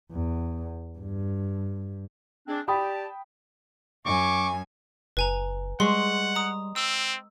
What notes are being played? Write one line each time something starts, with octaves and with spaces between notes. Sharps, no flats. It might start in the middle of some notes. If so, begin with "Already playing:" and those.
E2
G2
G#3 C4 D4
G4 D5 G5 A5 B5 D#6
F#2 G#5 C#6 D6
F#1 B4 G#5 A#5
G3 G#3 F#5 C6 C#6
A#5 D#6
C4 E6